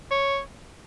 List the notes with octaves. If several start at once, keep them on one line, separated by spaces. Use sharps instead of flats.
C#5